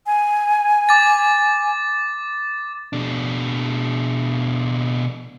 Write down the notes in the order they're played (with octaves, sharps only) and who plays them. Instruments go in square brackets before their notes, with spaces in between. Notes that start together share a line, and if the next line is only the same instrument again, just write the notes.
[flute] G#5
[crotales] D6 A6
[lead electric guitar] B2 D4